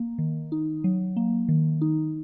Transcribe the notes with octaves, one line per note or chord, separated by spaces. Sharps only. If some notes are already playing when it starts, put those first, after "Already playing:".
Already playing: A#3
D#3
D#4
F#3
A#3
D#3
D#4